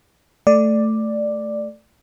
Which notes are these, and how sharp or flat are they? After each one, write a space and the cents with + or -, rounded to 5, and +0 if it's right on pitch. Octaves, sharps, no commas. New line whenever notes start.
A3 +0 D5 +5